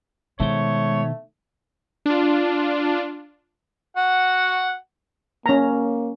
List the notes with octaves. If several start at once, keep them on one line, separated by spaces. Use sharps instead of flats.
B2 D#3 G#3 A3 C5 C#5
D4 F4
F#4 F#5
A#3 C#4 A#5